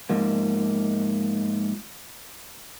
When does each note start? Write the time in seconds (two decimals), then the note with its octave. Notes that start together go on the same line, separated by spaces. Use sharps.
0.10 G#2 F3 A#3